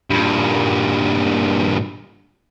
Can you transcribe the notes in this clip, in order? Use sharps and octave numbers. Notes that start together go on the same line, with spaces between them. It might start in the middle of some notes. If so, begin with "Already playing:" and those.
G2 A#2